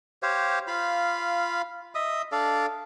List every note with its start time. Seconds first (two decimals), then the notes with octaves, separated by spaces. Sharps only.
0.23 G4 C5 C#5 F5
0.67 F4 F5 B5
1.95 D#5 E5 D#6
2.32 D4 A4 D5 F5